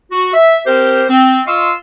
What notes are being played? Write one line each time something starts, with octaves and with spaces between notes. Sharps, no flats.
F#4
E5
C4 G4 A#4 C5
C4
F4 D#5 F5 C6 C#6 E6